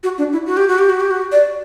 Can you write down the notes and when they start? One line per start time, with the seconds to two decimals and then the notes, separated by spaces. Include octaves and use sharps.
0.04 F#4
0.18 D4
0.32 E4
0.46 F#4
0.57 G4
0.68 F#4
0.79 G4
0.89 F#4
1.00 G4
1.11 F#4
1.32 D5